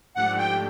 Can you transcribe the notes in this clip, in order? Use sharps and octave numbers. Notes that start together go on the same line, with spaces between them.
G#2 F3 A3 D4 G4 F#5
G5